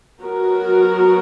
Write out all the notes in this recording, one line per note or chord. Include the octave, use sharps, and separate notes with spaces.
F#3 B3 F#4 A#4